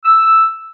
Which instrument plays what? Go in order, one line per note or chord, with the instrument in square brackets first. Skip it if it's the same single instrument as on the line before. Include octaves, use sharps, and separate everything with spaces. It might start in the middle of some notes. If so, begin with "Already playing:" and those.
[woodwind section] E6